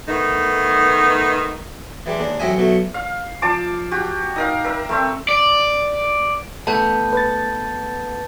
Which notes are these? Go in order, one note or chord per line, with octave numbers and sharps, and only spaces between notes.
D#3 A3 B3 D#4
E3 G3 G#3 D4
D#2 G#3 D4
A1 F#3 C4 D#5 E5 G#5
B2 F#3 A3
F5
F3 A5 D6
F#4 G4
D#4 A#4 F5
A#4 E5
A3 C4 E5
D5
A3 B3 A5 G6
B4 A6